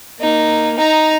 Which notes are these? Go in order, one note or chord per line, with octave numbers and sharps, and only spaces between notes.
A#3 D#4
D#4 A#5